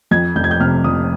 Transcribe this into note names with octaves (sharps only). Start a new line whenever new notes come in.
F2 G#6
F1 G6
G#6
G6
C3 F6
F1 D#6